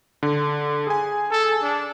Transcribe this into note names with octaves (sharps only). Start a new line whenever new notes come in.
D3
G#4 G#5
A4
D4